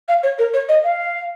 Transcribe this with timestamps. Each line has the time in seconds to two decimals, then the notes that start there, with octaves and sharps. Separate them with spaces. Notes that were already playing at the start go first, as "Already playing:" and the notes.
0.08 F5
0.23 C#5
0.38 A#4
0.53 C#5
0.68 D#5
0.84 F5